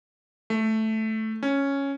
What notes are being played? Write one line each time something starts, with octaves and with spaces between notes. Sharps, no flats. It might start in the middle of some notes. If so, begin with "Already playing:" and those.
A3
C#4